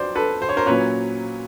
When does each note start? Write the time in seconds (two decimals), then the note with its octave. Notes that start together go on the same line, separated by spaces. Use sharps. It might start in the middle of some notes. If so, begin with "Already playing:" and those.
Already playing: F2 F#3 C5 D5
0.15 A4 B4
0.42 C5
0.49 C#5
0.57 A#4 C5
0.66 A#2 F#3 A#3 C#4 B4 C#5